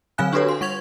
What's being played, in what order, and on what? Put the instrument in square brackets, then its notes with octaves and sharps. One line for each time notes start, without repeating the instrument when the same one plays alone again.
[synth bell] D3 F#3 C4 F5 G#5 F#6
D4 F#4 G4 A4 B4 C#5
C6
G3 C#6 G#6 F7